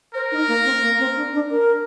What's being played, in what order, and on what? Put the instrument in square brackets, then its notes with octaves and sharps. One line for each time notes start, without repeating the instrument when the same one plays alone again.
[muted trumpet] A#4 [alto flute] C5
[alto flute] D#4
A#3
C4
A#3
C4
D4
D4
A#4